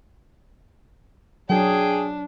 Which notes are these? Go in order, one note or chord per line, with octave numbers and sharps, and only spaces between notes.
F#3 D4 G#4 G5